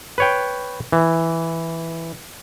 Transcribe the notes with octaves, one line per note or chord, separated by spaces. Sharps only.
B4 C#5 G5
E3